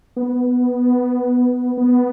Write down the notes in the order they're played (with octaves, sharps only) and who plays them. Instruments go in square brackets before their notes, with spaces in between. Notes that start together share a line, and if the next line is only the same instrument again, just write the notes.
[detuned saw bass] B3
B3